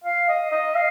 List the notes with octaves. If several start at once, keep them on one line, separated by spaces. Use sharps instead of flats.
F5
D#5
D#5
F5